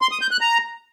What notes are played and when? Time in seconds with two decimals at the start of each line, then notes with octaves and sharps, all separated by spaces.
0.02 C6
0.11 D#6
0.21 G6
0.31 F#6
0.41 A#5